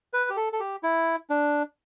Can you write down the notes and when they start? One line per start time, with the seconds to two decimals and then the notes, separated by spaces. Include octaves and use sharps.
0.13 B4
0.30 G4
0.37 A4
0.53 A4
0.60 G4
0.83 E4
1.30 D4